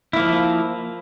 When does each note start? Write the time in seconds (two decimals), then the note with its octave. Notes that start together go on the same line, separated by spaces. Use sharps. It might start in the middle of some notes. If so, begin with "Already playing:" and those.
0.13 E4
0.16 A#3
0.19 F3